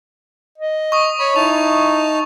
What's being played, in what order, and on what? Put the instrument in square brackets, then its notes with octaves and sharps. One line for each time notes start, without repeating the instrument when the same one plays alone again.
[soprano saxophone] D#5
[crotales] C#6 D#6
[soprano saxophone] C#5 [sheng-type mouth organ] B5
[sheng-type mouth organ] D#4 A5 [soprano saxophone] E4 [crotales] F7